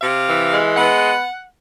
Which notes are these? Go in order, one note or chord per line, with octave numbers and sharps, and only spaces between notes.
C3 F5
E3
G#3
B3 F#5